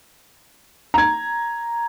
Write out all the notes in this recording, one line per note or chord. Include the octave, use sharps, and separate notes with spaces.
A#5 G#6